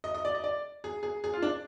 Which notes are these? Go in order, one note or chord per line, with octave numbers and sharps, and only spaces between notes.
D#5
D#5
D5
D#5
D5
G#4
G#4
G#4
F4
D4